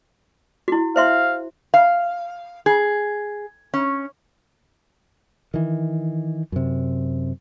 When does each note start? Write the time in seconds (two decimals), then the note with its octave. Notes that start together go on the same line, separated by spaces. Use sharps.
0.68 E4 F#4
0.96 C5 E5 F5 C6
1.74 F5
2.66 G#4
3.74 C#4
5.54 D#3 E3
6.52 F#2 C3